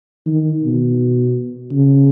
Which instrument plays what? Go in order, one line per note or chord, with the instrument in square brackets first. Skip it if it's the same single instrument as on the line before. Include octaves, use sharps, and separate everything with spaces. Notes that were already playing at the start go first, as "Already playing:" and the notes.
[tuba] D#3
B2
C#3